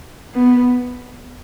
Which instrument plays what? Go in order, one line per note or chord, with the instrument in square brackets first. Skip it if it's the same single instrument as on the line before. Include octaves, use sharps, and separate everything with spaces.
[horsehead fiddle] B3